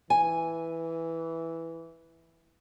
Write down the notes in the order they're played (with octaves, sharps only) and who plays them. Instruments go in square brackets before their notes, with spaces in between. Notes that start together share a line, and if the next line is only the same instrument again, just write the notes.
[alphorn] E3 [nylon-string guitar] G#5